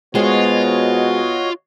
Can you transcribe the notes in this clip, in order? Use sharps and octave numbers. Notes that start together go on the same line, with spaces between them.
B2 G#3 B3 F4 F#4 C5 C#5 D#5